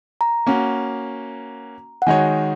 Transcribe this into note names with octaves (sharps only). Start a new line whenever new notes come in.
A#5
A#3 C#4 F#4
F#5
D#3 G#3 D#4 F#4 C#5 G#5
F#5